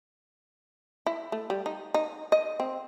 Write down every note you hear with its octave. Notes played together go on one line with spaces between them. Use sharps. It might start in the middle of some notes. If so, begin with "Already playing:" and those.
E4
A3
G3
D#4
D#4
D#5
C4